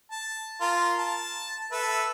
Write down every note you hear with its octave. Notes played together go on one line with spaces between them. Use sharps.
A5
F4 A#4
A5
A4 B4 E5